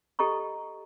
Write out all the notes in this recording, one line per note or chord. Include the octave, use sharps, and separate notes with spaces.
G4 A4 D#5 A#5 C#6